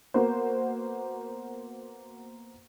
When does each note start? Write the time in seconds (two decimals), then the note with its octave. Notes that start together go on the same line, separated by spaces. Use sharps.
0.14 A#3 B3 F#4 C5